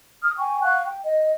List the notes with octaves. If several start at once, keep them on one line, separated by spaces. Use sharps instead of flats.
D#6 F6
G5 G#5 C#6
F5 F#5 C#6 F#6
G5
D#5